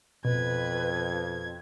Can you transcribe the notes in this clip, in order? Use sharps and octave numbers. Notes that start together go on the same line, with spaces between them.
F2 B2 B4 G#6